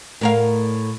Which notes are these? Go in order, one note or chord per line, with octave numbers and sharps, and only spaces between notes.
A2 A#4 F5